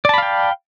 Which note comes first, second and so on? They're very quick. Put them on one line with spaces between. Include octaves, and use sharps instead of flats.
D5 A5 B5 F5 G5